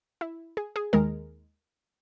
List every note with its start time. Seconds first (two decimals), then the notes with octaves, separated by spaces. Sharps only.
0.21 E4
0.57 G#4
0.76 G#4
0.93 D#2 D#3 G#3 A#4